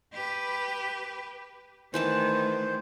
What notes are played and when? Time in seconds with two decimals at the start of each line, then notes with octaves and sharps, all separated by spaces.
0.13 G4 B4
1.94 D#3 E3 A3 B4 C5 A5